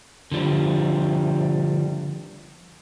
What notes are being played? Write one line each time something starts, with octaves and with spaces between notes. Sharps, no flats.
D3 F3 G3